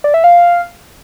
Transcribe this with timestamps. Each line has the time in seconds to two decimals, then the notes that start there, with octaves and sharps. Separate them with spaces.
0.04 D5
0.14 E5
0.24 F5